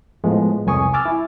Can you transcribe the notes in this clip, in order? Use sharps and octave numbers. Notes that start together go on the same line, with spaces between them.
A2 F3 G#3 B3
C2 F2 G#5 C#6 D#6
G#5 D6 E6 F6 A6
E4